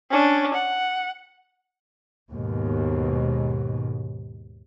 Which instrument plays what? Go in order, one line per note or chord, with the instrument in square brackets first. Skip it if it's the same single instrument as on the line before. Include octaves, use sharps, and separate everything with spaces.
[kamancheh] C#4 D4
F#5
[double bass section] D#2 G#2 B2